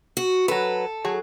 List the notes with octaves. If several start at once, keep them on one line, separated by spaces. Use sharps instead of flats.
F#4
F#3 A4 B4
F#3 G#4